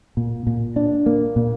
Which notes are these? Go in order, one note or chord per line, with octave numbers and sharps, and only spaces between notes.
A#2
A#2
D4
A#3
A#2